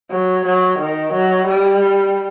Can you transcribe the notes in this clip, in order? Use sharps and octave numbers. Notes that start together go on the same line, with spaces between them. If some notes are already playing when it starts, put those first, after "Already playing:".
F#3
F#3
D#3
F#3
G3